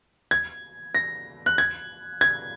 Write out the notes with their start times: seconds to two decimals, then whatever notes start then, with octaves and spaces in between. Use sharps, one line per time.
0.31 G#6
0.95 A#6
1.46 F#6
1.58 G#6
2.21 G#6